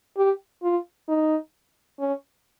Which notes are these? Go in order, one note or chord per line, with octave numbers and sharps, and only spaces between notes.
G4
F4
D#4
C#4